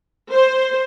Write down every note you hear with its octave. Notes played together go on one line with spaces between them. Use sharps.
C5